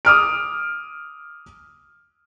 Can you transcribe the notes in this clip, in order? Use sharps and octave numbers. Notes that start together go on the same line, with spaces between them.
D6 D#6 F6 D7